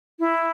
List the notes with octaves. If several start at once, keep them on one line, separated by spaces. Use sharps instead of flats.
E4